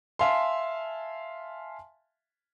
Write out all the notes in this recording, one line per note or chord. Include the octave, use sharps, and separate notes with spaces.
E5 F5 G#5 A5 C6